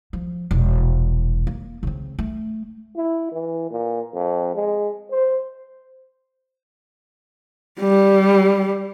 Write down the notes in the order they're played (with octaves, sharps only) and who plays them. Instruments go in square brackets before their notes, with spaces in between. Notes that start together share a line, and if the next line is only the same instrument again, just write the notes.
[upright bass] F3
E1 A#1
A#3
C#3 C4
A3
[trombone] E4
E3
A#2
F2
G#3
C5
[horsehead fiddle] G3